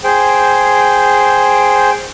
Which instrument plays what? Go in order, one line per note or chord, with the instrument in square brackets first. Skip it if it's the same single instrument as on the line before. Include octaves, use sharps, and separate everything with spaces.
[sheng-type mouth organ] G#4 C5 G5